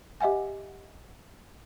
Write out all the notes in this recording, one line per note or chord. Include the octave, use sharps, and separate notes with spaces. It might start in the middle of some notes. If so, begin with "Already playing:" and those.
G4 D#5 E5 F#5 G#5